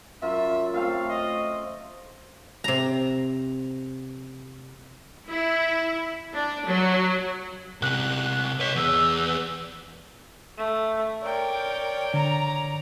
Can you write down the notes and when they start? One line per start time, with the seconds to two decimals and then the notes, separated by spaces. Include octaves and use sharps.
0.22 F#2 F4 E5
0.74 A3 C4 F4 F5
1.10 D#5
2.64 C3 A#5
5.30 E4
6.34 D4
6.66 F#3
7.82 C3 A#4 F#6
8.60 B4 C#5 B6
8.76 E2 B4 E6
10.57 A3
11.22 A#4 C#5 D5 G5
12.14 D3 A#5